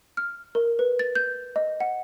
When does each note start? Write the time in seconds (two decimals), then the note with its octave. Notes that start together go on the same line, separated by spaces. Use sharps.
0.17 F6
0.55 A#4
0.79 B4
0.99 A6
1.15 G6
1.56 D#5
1.80 F#5